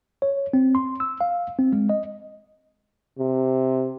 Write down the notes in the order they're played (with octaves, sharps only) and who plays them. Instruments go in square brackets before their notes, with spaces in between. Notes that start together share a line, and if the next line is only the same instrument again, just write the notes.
[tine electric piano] C#5
C4
C6
E6
F5
C4
G#3
D#5
[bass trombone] C3